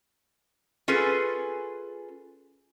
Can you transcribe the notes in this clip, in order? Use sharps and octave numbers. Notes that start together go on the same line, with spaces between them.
C#4 F4 G#4 A4 B4